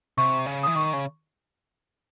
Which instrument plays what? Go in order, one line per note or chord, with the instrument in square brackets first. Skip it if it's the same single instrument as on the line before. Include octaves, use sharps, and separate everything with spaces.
[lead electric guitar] C3 [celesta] C#6
[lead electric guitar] C#3
[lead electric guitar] E3 [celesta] D#6
[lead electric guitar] D#3 [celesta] C#6
[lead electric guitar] C#3